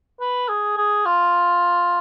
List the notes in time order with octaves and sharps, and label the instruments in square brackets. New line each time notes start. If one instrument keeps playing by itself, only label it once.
[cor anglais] B4
G#4
G#4
F4